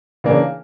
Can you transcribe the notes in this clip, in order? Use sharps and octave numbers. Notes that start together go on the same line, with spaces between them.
C#3 E3 A#3 D4